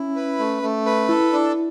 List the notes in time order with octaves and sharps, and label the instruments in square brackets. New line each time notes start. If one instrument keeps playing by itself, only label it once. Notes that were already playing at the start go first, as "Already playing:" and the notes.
Already playing: [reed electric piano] C#4 [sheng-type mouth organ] E4
[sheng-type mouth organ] B4
A3
A3
B4
[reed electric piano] E4 [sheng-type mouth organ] A4
[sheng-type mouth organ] D4